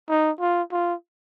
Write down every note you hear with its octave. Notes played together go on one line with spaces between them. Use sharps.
D#4
F4
F4